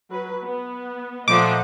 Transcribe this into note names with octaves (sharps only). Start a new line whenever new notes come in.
F#3 B4
B3
A#2 F3 A3 D#5 F#5 D6